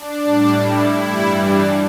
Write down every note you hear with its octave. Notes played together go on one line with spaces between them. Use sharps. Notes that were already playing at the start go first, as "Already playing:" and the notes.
Already playing: D4
A2 G3
E4
G2 E3 G3
D4